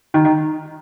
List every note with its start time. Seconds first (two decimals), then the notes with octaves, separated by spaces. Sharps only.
0.14 D#3
0.25 D#3